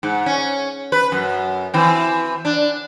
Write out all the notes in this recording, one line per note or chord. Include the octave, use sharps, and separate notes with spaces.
G#2
C#4
B4
F#2
E3 C4
D4